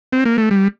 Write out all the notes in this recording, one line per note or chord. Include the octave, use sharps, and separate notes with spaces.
C4
A#3
A3
G3